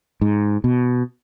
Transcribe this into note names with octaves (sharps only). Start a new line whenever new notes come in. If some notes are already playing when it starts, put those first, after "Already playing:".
G#2
B2